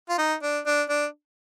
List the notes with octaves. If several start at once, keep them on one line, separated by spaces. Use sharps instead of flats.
F4
D#4
D4
D4
D4